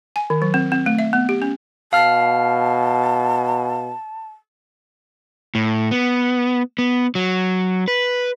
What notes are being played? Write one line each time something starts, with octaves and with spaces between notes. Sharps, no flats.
G#5
D#3
F#3
C4
C4
A3
E5
B3
G4
C#4
B2 F5 A5 F6
A2
B3
B3
F#3
B4